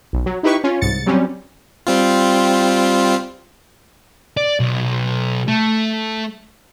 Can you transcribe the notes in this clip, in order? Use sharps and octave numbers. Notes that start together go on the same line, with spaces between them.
B1
F#3
D#4 E4 G4 B4 C#6
C#4 F4
C2 G#2 A6 C#7
F#3 G3 C4 C#4
G3 C4 F4
D5
B1
A3